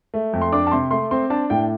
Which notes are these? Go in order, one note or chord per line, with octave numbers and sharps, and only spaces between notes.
A3
F2
C6
D4 D6
A5
C3 C6
A3 C6
C4 C6
D4 A5
A2 G5